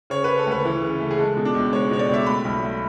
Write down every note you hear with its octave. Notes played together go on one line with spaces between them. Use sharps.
C#3 C#5
C#3 B4
A4
D2
B4
E3
C#3
A3
G#4
G#3 A4
B2
D4
C#2
G#3 C#5
B2 C#5
D5
C#2
E5
A3 B5
B1
A3